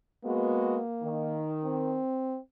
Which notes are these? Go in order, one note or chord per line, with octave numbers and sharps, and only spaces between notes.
G#3 A#3 B3 F#4
D#3
C4